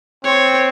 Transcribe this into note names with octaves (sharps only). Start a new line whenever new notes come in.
C4 C#5